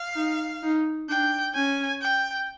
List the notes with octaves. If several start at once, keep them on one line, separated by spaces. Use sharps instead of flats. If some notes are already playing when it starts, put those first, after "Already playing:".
Already playing: F5
D#4
D#4
D4 G5
C#4 G#5
G5